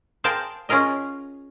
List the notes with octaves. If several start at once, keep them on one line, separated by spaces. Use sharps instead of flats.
G#4 A#4 C5 F5 G5 A5
C#4 F4 G#4 A#4 D#5